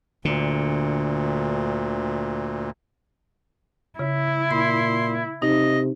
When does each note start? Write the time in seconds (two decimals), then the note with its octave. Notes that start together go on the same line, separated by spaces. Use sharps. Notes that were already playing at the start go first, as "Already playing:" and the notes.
0.25 D2 A#2 D3
3.99 C#3 E4
4.51 A#2 B5 C6
5.42 C3 D#4 D#5